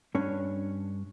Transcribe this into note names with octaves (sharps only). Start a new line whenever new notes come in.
G2 C#4 D4 C#5